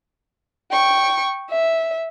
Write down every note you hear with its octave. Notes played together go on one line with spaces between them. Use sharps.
G5 C#6
E5